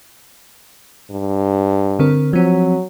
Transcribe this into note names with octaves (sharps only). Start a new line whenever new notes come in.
G2
D3 C4 A#4
F3 F#3 C4